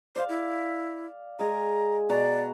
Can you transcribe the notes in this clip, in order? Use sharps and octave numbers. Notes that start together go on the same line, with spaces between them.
C5 D5 F5
E4
G#3 G#5 A#5
B2 F#4 D5 A#5